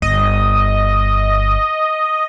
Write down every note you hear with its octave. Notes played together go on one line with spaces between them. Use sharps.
G1 D#5